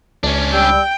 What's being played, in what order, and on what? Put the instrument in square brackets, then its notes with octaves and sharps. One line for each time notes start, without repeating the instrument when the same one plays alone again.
[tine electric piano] C#2 [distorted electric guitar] C#4 D4
[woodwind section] G3 E6 [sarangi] G5